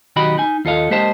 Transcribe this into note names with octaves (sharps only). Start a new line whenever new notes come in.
B1 D#3 F#4 G4 D#5 B5
D#4 G#5
D#2 F4 A4 D#5 F5
G#3 A#3 G4 C5 D#5 A5